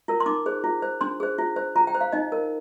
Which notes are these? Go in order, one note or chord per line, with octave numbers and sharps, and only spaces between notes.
F4 A#4
C6
D#4 D6
G#4 C5
F4
C5
D4 C6
G#4 C5
F4
C5
F4 A#5
G5
C5
F5
D#4 D#5
A#4